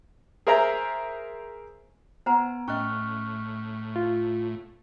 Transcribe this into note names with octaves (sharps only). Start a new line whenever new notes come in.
G#4 A#4 C5 E5 G#5 A#5
B3 C5 F#5 G#5 A#5
A2 C#4 D#5 C#6 F6 F#6
F4